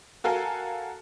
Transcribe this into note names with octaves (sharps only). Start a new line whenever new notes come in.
F#4 A4 A#4 F5 G#5